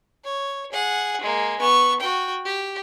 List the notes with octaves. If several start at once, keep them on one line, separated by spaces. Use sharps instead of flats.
C#5
G#4 F#5
G#3 A#3
B3 C#6
F#4 G5
G4